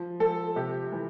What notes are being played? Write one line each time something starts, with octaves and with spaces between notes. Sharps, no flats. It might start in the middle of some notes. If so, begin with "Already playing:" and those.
Already playing: F3
F3 A4
C3 G4
E3